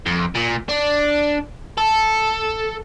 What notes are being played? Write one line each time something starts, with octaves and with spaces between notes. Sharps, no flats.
F2
A#2
D4
A4